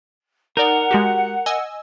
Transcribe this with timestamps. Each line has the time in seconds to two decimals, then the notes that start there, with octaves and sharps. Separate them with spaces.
0.57 D#4 A#4 D5 F#5
0.91 G#3 F#4 G4
1.46 D#5 G#5 E6